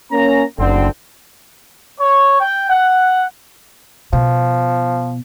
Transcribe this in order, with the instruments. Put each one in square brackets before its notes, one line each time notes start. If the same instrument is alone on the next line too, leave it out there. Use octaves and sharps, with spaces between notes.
[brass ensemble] A#3 C#4 A#5
[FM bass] F#1 [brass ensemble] D2 D3 C4
[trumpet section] C#5
G5
F#5
[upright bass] B2 [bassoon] F3